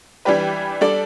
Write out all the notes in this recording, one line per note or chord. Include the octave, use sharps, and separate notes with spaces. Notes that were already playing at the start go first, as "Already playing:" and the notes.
E3 G3 D4 G4 B4
G3 D4 A4 D5